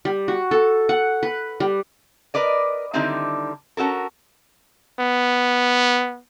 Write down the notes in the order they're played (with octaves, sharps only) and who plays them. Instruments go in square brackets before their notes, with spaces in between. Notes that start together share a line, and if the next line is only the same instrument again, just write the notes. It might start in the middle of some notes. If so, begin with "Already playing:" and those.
[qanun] G3
F#4
A4
F#5
B4
G3
[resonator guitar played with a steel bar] A#4 B4 D5 D#5
D3 D#3 G3 C4 D#4 E4
C#4 F#4 A4 A#4
[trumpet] B3